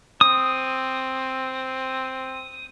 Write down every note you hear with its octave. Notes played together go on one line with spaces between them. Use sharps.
C4 D#6